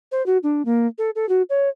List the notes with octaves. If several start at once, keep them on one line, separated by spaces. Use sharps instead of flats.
C5
F#4
D4
A#3
A4
A4
F#4
C#5